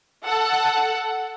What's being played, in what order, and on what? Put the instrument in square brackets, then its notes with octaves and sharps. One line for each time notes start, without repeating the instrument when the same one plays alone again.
[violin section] A4 F#5